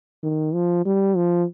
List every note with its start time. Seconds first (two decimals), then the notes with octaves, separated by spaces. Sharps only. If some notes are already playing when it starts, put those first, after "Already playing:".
0.23 D#3
0.54 F3
0.85 G3
1.16 F3